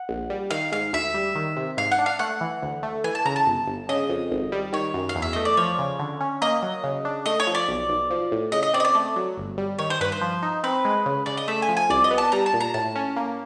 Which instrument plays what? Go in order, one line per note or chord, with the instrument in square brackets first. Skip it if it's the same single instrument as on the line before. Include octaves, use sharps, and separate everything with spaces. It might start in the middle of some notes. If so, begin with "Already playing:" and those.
Already playing: [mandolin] F#5
[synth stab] A#1
G3
[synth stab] D#3 [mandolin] F5
[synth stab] G#2 [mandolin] F5
[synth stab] D2 [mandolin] E5
[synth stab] G3
D#3
C3
[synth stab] G#2 [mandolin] F5
[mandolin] F#5
[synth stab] D4
[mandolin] F5
[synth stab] A3 [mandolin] F#5
[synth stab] E3
D2
A3
[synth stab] E3 [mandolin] G#5
[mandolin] A5
[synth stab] C#3 [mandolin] A#5
[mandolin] A5
[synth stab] G1
G1
[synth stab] C#3 [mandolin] D#5
[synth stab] F2
G#1
G3
[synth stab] D#3 [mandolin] C#5
[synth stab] F#2
[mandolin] F5
[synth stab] E2
[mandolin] E5
[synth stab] A3 [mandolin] D#5
[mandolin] D5
[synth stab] F3 [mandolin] C#5
[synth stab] C#3
D3
C#4
[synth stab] A#3 [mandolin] D#5
[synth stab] F#3
C#3
D4
[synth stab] A3 [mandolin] D#5
[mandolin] C#5
[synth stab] F3
[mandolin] D5
[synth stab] B1
B1
F3
A2
[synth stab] C#3 [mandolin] D#5
[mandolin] D#5
[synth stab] C4 [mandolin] D5
[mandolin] D#5
D5
[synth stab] A3
F#3
G1
G3
[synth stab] D#3 [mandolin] C#5
[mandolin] C5
[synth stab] G2 [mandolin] B4
[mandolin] C5
[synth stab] F3
D#4
[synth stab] C4 [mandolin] B4
[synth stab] G#3
C#3
[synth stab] C#3 [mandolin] D5
[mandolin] D#5
[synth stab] A3 [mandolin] E5
[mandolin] G#5
[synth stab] F3
[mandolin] G#5
[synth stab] C2 [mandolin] D5
[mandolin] D#5
[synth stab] B3
[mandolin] A5
[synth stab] G3 [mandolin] A#5
[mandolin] A5
[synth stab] A#2
[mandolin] A#5
[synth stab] A2 [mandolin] A5
[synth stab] C#4
A#3